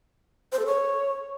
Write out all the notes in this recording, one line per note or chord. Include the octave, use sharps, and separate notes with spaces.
C5
A4
C#5